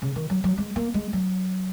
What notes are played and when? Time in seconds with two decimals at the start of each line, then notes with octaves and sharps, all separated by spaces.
0.02 C#3
0.16 D#3
0.30 F#3
0.44 F#3
0.58 G#3
0.76 A#3
0.94 G#3
1.13 F#3